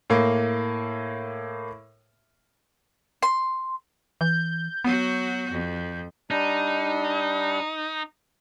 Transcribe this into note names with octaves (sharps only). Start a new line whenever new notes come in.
A2 A#3
C6
E3 G6
F#3 B3 F#4
F2
G3 D4 D#4